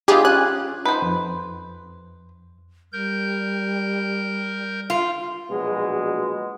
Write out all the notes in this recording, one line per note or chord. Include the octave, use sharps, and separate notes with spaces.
B3 D4 F4 G4 G#4 D#5
C#4 F4 G#5 F#6
D#4 B4 C5
F2
G3 A#4 G6
F4
A#1 B2 F#3 G#3